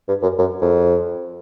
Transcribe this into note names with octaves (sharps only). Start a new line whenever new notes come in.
G2
F#2
F#2
F2